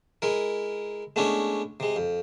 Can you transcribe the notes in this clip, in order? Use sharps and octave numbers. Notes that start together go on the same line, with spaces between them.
G#3 E4 A#4
G#3 A3 B3 C#4 D4 E4
C3 G#3
F2